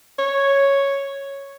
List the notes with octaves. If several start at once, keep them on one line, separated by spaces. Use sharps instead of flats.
C#5